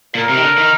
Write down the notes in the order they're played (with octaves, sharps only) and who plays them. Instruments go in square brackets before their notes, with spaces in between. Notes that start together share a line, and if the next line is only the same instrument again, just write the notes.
[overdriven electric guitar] A#2 [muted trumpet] A#4
[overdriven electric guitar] C3
D#3
D3
D#3